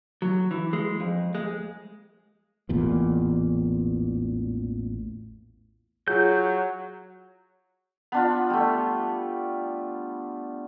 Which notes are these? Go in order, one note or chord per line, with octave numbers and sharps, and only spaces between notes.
F#3
E3
G#3
F2
G#3
A1 E2 A#2
F#3 F4 G#4 G6
B3 D4 F4
G3 A3